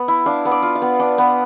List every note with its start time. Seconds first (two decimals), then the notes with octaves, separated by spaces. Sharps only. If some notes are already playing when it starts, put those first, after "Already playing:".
Already playing: B3
0.08 E4
0.26 D4 F5
0.45 B3
0.51 D5
0.62 F4
0.75 F5
0.82 B3
1.00 D4
1.18 B3